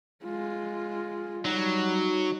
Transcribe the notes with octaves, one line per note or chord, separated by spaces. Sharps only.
G#3 F4
F#3 G3 D#4